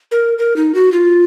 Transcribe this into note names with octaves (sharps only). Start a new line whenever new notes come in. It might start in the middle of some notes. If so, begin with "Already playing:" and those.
A#4
A#4
D#4
F#4
F4